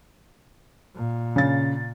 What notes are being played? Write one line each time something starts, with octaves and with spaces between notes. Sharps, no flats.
A#2
C#3 A6